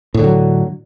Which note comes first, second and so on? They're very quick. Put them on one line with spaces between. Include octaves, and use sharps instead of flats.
A2 D3 F#3